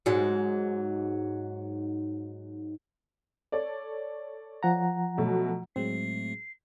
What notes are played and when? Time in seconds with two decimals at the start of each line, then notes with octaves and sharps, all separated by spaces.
0.06 G#2 F#3
3.52 A4 C#5 D5
4.63 F3 F#5 A#5
5.18 B2 F#3 A3
5.76 A2 F#3 G#3 A3 C4 C7